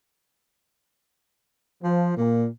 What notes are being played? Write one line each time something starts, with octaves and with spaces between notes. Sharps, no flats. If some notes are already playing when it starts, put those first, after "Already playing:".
F3
A#2